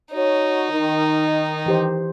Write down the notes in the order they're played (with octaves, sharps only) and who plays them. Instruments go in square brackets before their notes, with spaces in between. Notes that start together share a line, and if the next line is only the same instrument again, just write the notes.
[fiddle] D#4 [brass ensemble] F#4 C#5
[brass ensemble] D#3
[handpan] E3 G4 C5